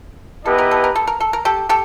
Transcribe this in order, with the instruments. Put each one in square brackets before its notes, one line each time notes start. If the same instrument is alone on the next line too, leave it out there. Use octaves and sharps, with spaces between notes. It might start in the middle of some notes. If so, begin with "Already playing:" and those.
[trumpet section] B3 E4 G4 B4 D#5 [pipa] A4
[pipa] A#4
A4
A#4
A4
A#4
A4
A#4
G4 A4
G4 A4